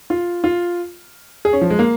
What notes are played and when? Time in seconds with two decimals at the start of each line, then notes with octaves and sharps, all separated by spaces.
0.10 F4
0.44 F4
1.45 G#4
1.53 C#4
1.61 F3
1.70 G#3
1.79 A#3